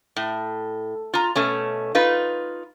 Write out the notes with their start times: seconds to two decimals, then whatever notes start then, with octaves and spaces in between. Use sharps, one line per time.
0.16 A2
1.14 F4 A#5
1.36 B2 A3 C#4
1.95 D#4 F4 B4